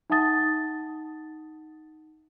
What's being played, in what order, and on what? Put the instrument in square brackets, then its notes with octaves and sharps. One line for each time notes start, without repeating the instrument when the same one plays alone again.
[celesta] D#4 E5 F#5 A5 D#6 A6